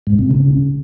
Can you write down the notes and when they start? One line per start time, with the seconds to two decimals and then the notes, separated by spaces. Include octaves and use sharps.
0.07 G#2
0.19 C3
0.31 C#3